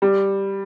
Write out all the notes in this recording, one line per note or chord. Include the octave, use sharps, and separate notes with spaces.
G3